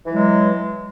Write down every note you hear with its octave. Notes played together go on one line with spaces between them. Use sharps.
E3 F#3 G#3